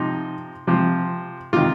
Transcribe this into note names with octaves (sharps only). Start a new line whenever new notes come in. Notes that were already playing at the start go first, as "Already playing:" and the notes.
Already playing: C3 F3 D#4
C3 F3
C3 D#3 F4